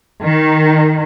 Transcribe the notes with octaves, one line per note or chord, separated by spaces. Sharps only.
D#3